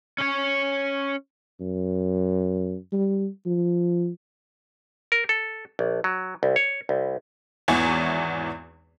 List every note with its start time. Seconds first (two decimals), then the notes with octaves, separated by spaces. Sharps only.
0.18 C#4 C#5
1.60 F#2
2.92 G3
3.46 F3
5.12 A#4
5.29 A4
5.79 A#1
6.04 F#3
6.43 C2
6.56 C#5
6.89 C2
7.68 G#1 E2 E3 B3 C#5 G#5